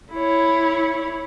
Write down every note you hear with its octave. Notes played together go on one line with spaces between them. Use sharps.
E4 C#5